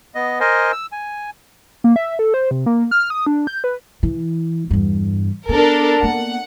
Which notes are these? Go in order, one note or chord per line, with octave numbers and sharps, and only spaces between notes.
B3 D#5
A#4 C5 D#5 G#5
E6
G#5
A#3
E5
A4
C5
C3
A#3
F6
D#6
D4
G6
B4
E3
E2 G2
B3 D4 A4 A#4
A#3 B3 F#5